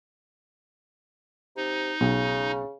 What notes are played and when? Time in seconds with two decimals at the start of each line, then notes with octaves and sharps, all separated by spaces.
1.57 C3 D#4
2.01 B1 C#3